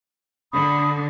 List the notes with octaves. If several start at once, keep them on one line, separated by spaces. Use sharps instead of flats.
D3 B5 D#6